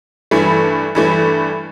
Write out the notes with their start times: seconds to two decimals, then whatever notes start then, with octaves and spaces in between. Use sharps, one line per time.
0.31 G2 E3 A3 B5
0.95 G2 E3 A3